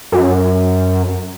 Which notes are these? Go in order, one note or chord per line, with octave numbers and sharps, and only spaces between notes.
F#2